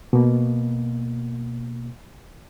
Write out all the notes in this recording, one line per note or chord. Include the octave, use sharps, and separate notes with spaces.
B2 A#3